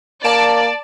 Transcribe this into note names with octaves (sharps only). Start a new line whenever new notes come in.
A#3 D5 A5 D7 E7